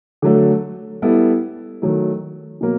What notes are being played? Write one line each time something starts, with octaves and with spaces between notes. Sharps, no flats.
D3 F#3 A3
G3 B3 E4 A4
D#3 F#3 A3
B2 F#3 A#3